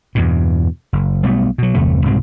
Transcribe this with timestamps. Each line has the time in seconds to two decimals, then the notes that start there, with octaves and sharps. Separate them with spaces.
0.15 E2 G2 B2
0.93 F#1
1.23 B1 B2 G3 A3
1.58 B2 F#3
1.74 G1 E2 C3 A3
2.06 C2 G#2 B2 C4